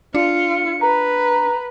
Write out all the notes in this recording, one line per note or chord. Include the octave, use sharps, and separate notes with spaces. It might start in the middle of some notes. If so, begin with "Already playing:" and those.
D4 F4 C#7
B4 A#5